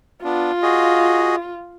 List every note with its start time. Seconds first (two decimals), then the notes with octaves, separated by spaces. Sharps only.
0.24 B3 D4 F4
0.63 F#4 G#4 D#5